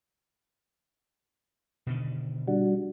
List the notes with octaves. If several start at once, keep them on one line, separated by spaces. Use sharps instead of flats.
B2 D3 D#3
G3 D4 F#4